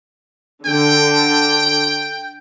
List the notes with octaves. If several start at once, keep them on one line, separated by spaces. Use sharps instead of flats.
D3 G5